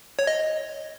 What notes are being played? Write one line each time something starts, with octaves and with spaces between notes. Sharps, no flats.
C#5
D#5